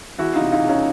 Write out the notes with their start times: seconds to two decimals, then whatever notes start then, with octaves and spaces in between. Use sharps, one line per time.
0.18 E2 E4 F#4
0.35 D#4 F4
0.41 C3
0.52 D#4 F4
0.63 E1
0.69 C#4 D#4